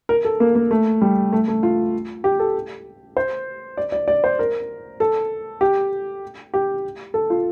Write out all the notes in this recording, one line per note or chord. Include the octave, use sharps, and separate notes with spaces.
A#4
A4
A#3
A#3
A3
G3
A3
A3
F4
G4
A4
C5
D5
D5
D5
C5
A#4
A4
G4
G4
A4
F4